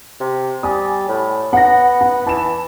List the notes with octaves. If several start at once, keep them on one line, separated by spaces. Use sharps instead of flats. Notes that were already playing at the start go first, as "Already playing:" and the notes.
C3
G3 G#5 D#6
A2
B3 F#5 A#6
F#5
E3 A5 E7